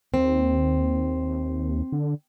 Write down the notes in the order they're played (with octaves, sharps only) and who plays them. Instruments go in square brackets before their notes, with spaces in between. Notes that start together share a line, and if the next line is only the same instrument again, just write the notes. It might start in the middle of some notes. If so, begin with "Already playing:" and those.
[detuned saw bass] D#2 [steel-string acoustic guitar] C4
[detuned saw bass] D3